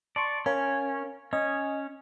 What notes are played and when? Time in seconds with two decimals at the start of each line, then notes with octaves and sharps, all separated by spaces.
0.16 D5 A5 C6 C#6
0.46 C#4 A#4 C#5 F5
1.33 C#4 D#5